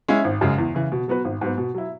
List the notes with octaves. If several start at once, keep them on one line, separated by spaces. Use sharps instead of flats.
G#3 C#4 E4
G#1
F#2 C#3 G#3
E2
C#3 E3
B2
F#3 B3 F#4 B4
G#1
G#2 F#3 B3
B2
F#3 E4